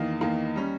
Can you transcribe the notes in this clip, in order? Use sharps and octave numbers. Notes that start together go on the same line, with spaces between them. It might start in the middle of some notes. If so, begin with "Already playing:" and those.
Already playing: E2 D#3 A#3 D#5
E2 D#3 A#3
G3 C#4